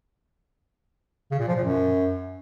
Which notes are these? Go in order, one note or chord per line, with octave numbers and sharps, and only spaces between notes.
C#3
A#2
F3
A#2
F#2